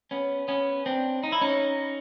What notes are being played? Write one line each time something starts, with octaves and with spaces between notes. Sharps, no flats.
B3 C#4
B3 C#4
C4 D4
D#4
E4
C#4 D#4